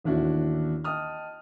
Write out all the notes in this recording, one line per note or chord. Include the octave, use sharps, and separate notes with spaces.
A1 D#2 D4 E4 F#4
D#5 G5 A5 D#6 F6